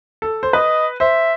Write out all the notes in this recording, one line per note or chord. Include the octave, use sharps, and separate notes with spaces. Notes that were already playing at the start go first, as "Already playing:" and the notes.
A4
C5
B4 D#5
C5 E5